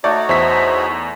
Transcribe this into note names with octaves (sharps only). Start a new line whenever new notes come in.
A3 D#4 F#4 C#5 D5
E2 C5 E5 B6